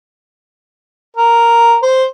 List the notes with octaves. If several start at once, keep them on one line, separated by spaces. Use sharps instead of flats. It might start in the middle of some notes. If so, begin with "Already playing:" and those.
A#4
C5